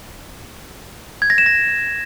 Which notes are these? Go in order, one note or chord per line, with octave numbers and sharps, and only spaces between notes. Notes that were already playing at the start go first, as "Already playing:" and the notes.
G#6
A#6
E7
A#6